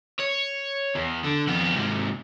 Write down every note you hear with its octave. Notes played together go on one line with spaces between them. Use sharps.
C#5
E2
D3
F2 B3
G#2 C3